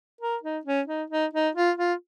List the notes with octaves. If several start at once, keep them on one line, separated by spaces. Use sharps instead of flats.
A#4
D#4
C#4
D#4
D#4
D#4
F4
F4